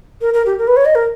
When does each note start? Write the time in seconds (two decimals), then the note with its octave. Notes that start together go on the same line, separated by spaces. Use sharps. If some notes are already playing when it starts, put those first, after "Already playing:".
0.21 A#4
0.34 A#4
0.46 G4
0.59 A#4
0.68 B4
0.77 C#5
0.85 D#5
0.95 A#4